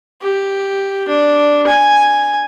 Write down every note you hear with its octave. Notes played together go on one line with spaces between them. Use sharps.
G4
D4
G#5